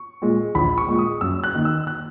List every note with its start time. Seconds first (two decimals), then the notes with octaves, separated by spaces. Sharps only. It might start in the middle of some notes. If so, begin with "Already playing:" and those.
Already playing: C#6
0.22 A#2 G#3
0.55 A#1 B5
0.78 C#6
0.88 A#2 G#3
0.99 D#6
1.21 F#2 E6
1.44 F#6
1.54 D#3 A#3
1.65 E6
1.87 F#6